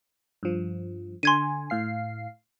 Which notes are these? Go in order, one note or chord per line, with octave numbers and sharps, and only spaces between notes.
G2 F3
D3 G#5 C6 G#6 D#7
A2 F5 C7